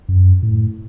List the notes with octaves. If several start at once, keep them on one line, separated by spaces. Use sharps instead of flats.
F#2
A2